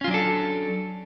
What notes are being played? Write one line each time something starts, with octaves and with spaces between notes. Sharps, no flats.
F#3 C#4 D4 F4 A4